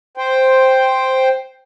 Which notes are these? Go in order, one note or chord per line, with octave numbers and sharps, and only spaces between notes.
C5 G5